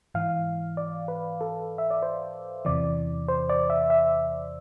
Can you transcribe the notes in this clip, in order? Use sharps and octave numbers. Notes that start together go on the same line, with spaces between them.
G#2 E3 F5
D5
B4
A4
E5
D5
C5
E2 C3 E3 D5
C5
D5
E5
E5